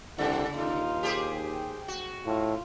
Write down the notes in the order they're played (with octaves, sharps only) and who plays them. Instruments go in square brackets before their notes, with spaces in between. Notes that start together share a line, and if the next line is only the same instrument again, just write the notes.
[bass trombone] C2 [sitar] C#3 [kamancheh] F#5
[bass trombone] D#2 [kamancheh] D#4 F4
[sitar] G4 G#4 C5
[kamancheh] G5
[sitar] F#4
[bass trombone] A2 [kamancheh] F4